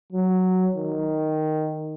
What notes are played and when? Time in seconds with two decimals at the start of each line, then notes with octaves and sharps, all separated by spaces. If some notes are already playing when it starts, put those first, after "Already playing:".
0.13 F#3
0.76 D#3